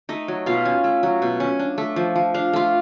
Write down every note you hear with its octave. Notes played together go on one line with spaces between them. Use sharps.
A3 D#4 D#5
F#3
B2 F4 F5
C#4
A3
F#3
B2
C#4
D4
A3
F3
F3
D4 F5
A3 F4 F5